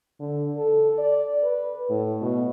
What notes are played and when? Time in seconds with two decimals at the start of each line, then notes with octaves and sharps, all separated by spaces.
0.20 D3
0.57 A4
0.99 D5
1.43 B4
1.90 A2
2.22 B2